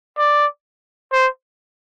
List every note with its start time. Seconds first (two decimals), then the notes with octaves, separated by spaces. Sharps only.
0.18 D5
1.12 C5